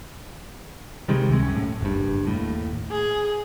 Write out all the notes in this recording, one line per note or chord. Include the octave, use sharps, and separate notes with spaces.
C3 D#3 G3 G#3
C#2 C3 G#3
F#2 C#4
A2
F#1 G2
D#2 A2
G#4